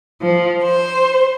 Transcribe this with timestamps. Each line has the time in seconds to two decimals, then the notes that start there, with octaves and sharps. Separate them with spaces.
0.21 F3
0.63 C5